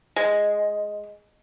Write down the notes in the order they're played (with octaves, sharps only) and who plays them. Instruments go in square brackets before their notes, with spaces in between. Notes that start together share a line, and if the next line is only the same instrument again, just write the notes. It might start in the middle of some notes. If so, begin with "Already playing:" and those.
[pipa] G#3